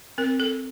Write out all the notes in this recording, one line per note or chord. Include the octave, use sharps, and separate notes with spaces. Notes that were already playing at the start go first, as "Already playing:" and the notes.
C4 A#4
A4